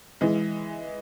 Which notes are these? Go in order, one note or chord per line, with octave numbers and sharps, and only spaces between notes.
E3 G#3